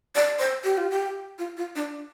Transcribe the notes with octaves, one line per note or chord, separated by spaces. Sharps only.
D5
C5
G4
F4
G4
F4
F4
D4